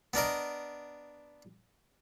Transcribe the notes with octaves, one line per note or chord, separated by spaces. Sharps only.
B3 D4 A#4 D#5